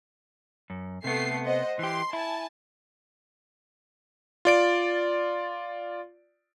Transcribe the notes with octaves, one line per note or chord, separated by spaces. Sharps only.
F#2
C3 A3 B3 C7
C5 D#5 F#5
E3 G4 C6
E4 G#5 A5
F4 D5 D7